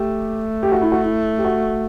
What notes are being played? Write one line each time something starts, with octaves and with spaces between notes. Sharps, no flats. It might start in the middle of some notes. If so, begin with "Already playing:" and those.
Already playing: A3 G4
G4
F#4
E4
F#4
E4
G4
F#4